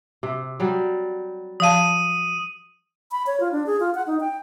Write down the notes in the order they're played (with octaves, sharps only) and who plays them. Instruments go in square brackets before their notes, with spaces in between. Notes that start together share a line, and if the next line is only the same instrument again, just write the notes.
[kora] C3
F#3 G3
[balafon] F3 F5 A5 [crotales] D#6 D#7
[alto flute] B5
C#5
F4
D4
G#4
F4
F#5
D#4
G5